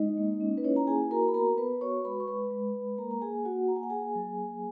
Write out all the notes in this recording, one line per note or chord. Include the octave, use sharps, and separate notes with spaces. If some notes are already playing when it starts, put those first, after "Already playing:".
Already playing: G#3 D#4 D#5
A#3
C#4
B4
C#4 E4 C#5
A#5
A#3 G#4 G#5
F#4 A#4 A#5
B5
B3 A#4 A#5
B3 B4 B5
F#4 C#5 C#6
G#3 B4 B5
C#6
G#3 B4 B5
G#3
G#3
A#3 A#4 A#5
A#5
A#3 G#4 G#5
A#3 F#4 F#5
A#3 A#5
G#5
F#5
A#3 G#4 G#5
F#3
A#3